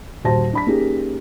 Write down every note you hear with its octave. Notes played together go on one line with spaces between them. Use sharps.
D#1 F#4 G4 C5 A5 A#6
D4 B5 B6
A#3 C#4 D#4 G4 G#4